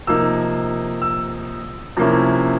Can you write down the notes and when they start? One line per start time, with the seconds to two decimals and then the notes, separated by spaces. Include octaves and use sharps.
0.07 C3 F3 A#3 D#4 E6
1.02 E6
1.97 C3 F3 A#3 C#4 E4